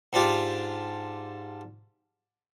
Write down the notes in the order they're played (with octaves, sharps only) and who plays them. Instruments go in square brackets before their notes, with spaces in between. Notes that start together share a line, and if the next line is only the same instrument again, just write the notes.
[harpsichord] G#2 D4 F4 G4